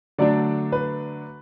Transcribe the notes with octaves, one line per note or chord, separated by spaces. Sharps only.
D3 F#3 A3 D4 D5
B4